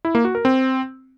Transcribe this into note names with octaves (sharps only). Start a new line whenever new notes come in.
E4
A#3
F#4
A#4
C4